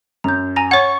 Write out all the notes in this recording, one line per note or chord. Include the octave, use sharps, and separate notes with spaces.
F#2 A#5 G6
G#5 A#5 A#6
C#5 F#5 C#6 G#6